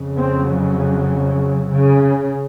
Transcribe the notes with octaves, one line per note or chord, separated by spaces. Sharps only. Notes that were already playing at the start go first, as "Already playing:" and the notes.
Already playing: F2 C#3
C4
F#3
C#3